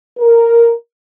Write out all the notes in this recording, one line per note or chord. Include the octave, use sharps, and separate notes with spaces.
A#4